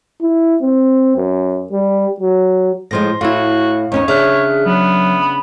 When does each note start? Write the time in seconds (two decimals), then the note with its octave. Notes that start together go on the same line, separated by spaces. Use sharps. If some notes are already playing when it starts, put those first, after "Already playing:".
0.21 E4
0.62 C4
1.16 F#2
1.72 G3
2.20 F#3
2.91 A2 F3 G#3 C6 A#6
3.21 A2 E4 F#4 F5
3.92 D#2 C#4 D#4 C#5
4.08 C#3 D4 G#4 E5 F6 F#6
4.66 F#3 B3
5.22 B5